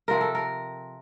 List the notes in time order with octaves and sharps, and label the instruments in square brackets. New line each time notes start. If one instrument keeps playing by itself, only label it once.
[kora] C3 F3 C4 A#4
A4
A#4